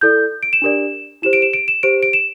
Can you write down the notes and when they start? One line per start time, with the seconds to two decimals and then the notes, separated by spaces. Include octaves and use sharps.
0.01 E4 A4 D5 G6
0.43 D7
0.53 E7
0.62 D4 G4 A#4 D5
1.22 E4 G4 C5 E7
1.33 D7
1.42 E7
1.53 D7
1.68 E7
1.83 G4 C5 D7
2.03 D7
2.13 E7